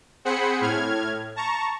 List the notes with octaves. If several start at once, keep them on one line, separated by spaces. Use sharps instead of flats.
C4 G#4 C5 F#5 B5 C#7
A2 F6 G#6
A5 A#5 C#6